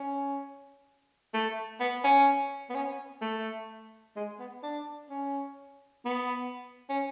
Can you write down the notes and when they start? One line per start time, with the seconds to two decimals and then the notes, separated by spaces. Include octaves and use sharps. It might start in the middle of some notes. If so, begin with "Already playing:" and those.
Already playing: C#4
1.34 A3
1.80 B3
2.04 C#4
2.70 B3
2.75 C#4
3.22 A3
4.16 G#3
4.39 B3
4.63 D4
5.10 C#4
6.05 B3
6.90 C#4